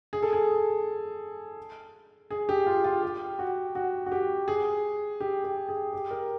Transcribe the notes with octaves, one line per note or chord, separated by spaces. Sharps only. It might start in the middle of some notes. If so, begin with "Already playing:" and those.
G#4
A4
G#4
G#4
G4
F4
F4
G4
F#4
F#4
F#4
G4
G#4
G4
G4
G#4
G4
A#4